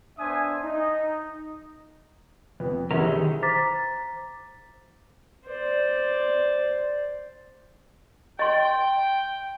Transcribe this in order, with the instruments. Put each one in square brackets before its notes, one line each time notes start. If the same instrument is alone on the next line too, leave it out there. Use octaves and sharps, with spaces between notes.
[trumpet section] B3 D4 C5 E5 G#5 D#6
D#4
[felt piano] F2 [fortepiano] B3
[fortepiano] B1 E4 [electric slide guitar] E3 C#4 A#4 [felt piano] G4 G#4
[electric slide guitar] D#3 D#4
[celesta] C5 A#5 D6 A6 B6
[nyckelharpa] C5 D5
[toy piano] D#5 C6 [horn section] G5